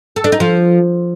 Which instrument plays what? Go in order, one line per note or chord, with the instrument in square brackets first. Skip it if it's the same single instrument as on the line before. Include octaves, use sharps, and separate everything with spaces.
[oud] A4
D4
D#4
F3